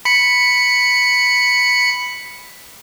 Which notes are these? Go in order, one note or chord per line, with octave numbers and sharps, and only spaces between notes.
B5 C#7